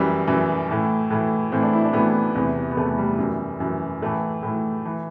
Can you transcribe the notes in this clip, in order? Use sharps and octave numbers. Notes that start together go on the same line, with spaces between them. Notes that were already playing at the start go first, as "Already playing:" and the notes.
Already playing: F#2 E3 G3
F#2 E3
A2 E3
A2 E3
A2 E3 C4
D4
E4
D4
A2 E3 B3
E2 C3 E3
B3
E2 C3 E3 A3
G3
F#2 E3
F#2 E3
A2 E3 A3
A2 E3
E3